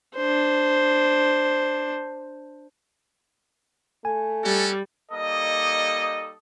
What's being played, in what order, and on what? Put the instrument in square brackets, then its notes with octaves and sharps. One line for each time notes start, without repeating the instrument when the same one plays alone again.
[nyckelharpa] D4 C5
[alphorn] A3 [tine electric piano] G#5
[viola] G3 [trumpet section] C#4 F#4 A4
[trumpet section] G3 A#3 D#4 A4 D#5 D#6